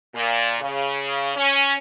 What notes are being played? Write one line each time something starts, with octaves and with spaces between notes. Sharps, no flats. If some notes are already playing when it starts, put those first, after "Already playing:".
A#2
C#3
C#4